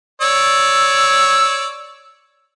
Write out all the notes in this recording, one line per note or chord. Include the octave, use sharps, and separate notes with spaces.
C#5 D5 E6